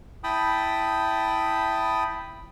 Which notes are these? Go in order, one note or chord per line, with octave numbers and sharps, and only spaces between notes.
E4 G5 A5 B5 D#6